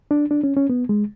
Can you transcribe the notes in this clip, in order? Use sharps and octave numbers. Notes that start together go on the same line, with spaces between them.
D4
D4
C#4
C#4
B3
G#3